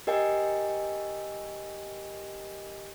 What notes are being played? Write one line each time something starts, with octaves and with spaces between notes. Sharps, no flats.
G4 A#4 D#5 G5 G#5